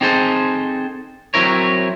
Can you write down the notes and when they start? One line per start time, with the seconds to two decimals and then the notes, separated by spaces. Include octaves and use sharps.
0.01 C4 D#4 G#4 A4 C5
1.34 F#3 C4 E4 A#4 C#5